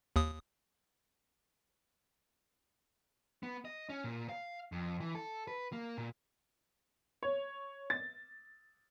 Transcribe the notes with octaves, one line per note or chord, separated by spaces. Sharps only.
D#2 D#6
B3
D#5
C#4
A#2
F5
F2
E3
A4
B4
A#3
A#2
C#5
A6